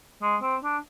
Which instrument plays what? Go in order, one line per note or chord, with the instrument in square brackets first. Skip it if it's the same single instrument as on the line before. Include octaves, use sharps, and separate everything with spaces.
[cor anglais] G#3
C4
D4